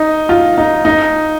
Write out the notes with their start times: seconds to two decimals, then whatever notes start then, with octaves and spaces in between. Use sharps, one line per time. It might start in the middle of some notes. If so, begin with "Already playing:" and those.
Already playing: D#4
0.29 F4
0.58 D#4
0.85 D#4